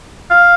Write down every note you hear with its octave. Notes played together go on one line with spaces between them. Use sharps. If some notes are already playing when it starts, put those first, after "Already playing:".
F5